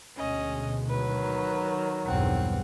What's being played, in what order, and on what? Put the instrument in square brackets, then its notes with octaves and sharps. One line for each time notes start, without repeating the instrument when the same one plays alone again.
[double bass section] D2 B2 G#3 [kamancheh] C#4 D#5
[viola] D#3 F#3 [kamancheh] B4
[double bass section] B1 E2 G2 [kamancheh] C4 F#5